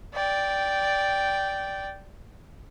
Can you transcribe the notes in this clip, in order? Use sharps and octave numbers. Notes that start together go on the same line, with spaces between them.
D5 G5